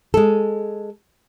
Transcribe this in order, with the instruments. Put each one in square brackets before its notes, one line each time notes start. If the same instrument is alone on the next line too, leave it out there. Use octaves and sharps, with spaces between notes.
[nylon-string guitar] G#3 A4